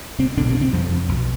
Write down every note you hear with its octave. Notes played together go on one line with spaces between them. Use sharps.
C3 C4
B1 B2 D3 D4
C3 C4
C3 C4
F2 F3
B1 B2